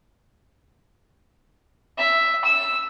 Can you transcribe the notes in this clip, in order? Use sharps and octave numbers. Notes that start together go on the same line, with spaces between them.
E5
E6